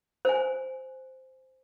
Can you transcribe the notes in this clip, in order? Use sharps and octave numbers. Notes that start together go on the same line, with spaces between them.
C5 G#5